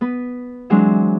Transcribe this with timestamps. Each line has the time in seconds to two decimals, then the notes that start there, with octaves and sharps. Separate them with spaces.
0.01 B3 B4
0.70 E3 F#3 G#3 C4 D4